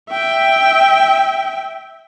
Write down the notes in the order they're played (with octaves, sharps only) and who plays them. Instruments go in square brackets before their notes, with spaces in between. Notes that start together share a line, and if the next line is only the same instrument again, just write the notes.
[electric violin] E5 G5